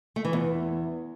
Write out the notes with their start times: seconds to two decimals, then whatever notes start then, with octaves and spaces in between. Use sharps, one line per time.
0.16 A3
0.25 E3
0.33 E2